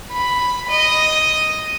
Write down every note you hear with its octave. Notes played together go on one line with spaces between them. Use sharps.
B5
D#5